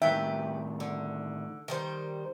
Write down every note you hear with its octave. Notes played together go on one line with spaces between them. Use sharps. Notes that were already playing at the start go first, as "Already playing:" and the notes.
A2 D#3 G4 B4 E5
D3
D#3 G3 C5